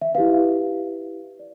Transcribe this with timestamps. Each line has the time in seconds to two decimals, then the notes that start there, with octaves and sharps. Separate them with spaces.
0.02 E5
0.15 E4 G4 B4 F5
1.39 D5